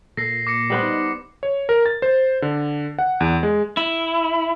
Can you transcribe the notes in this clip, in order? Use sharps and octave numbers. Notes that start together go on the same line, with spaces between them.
A#2 A4 A#6 C7
D6 A#6 C#7
G3 B3 C5
D#4
C#5
A#4
A6
C5
D3
F#5
E2
G#3
E4